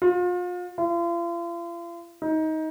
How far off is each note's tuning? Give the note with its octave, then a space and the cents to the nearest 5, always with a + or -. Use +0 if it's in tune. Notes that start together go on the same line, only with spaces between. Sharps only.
F4 +35
F4 -40
D#4 +20